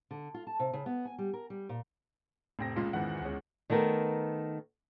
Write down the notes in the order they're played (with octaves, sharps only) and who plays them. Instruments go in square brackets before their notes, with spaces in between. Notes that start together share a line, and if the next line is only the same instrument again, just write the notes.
[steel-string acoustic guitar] D3
F4
A5
C3
C#3
B3
G#5
G3
A#4
G3
A#2
[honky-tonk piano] F1 C4 A#6 [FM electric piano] A2
[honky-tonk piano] C#2 A#2 [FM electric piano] G#3 C#4 F4
[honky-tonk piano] E2 F#5 [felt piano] G#2 D#3 E3
[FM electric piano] D2 [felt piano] G#3 C#4
[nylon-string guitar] D#3 A3 B3 A#4